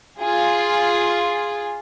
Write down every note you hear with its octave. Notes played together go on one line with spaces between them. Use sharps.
F4 G#4